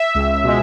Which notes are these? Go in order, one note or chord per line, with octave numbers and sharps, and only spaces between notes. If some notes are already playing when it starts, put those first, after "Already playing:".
Already playing: E5
C#2
B2 G#3